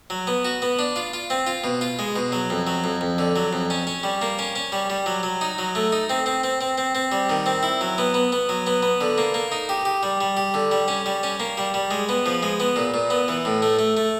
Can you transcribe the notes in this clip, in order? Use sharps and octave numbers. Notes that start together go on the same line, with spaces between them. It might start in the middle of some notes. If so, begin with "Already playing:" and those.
F#3
B3
F#4
B3
D4
F4
F4
C4
F4
B2
F4
G#3
B2
F#3
F2
F#3
F2
F2
D3
F#3
F2
C#4
C#4
G3
A#3
C#4
C#4
G3
G3
F#3
F#3
D#4
F#3
A3
D#4
C4
C4
C4
C4
C4
C4
G3
D#3
C4
E4
F#3
B3
B3
B3
F#3
B3
B3
D3
A#3
A#3
D#4
G4
G4
G3
G3
G4
D3
G3
C#4
G3
C#4
A#3
G3
G3
G#3
B3
F3
G#3
B3
A#2
A#2
B3
E3
A2
A3
A3
A3